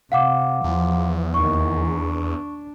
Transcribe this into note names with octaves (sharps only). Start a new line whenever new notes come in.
C3 F5 F#5 D6
E2 F3
D#2 D#3 C#6
D4